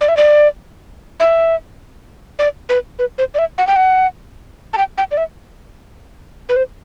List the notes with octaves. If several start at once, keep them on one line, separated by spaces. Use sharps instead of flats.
D5
E5
D5
E5
D5
B4
B4
C5
D5
E5
F#5
G5
F#5
A5
G5
G5
D5
E5
B4
C5